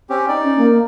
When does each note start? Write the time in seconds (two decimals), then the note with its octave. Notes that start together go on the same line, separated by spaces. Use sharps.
0.10 C4 C#4 G4
0.28 D#4 D5
0.44 C#4
0.58 A#3